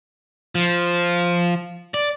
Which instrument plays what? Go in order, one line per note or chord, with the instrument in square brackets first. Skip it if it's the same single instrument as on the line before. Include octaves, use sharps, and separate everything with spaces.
[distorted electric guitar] F3
D5